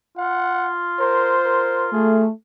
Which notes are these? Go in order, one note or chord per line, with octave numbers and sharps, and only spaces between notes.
F4 F#5
A#4 C5
A#4
A3 G#4